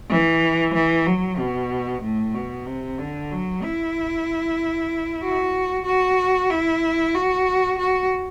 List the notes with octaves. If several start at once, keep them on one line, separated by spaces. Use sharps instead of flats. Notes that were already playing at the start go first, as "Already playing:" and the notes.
E3
E3
F#3
B2
A2
B2
C3
D3
F#3
E4
F#4
F#4
E4
F#4
F#4